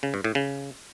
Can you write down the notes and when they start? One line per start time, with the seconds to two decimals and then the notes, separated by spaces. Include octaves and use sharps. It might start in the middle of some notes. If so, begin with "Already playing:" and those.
0.03 C#3
0.14 G2
0.24 A2
0.35 C#3